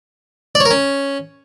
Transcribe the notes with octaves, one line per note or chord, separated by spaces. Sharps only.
D5
C#5
A#4
C#4